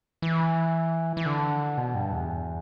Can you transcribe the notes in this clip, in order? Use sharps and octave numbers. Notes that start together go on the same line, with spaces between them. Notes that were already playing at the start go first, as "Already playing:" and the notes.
E3
E3
D3
B2
G2
E2